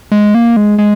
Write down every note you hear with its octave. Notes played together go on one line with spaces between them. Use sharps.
G#3
A#3
G#3
G#3